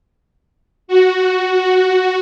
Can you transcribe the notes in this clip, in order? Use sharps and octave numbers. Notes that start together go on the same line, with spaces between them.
F#4